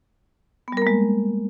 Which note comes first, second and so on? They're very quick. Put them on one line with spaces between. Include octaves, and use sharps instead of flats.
B3 G3 A#4 A#3 G#3